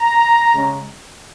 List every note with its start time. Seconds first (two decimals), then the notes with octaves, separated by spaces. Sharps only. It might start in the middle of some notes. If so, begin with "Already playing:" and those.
Already playing: A#5
0.54 C#3 G#3 C#4